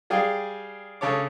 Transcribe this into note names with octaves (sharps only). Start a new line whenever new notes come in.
G3 G#4 D5 F5 G5
C#3 A4 C#5 D6